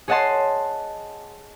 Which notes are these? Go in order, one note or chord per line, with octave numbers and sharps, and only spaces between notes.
G#4 C#5 D#5 F#5 A5 C6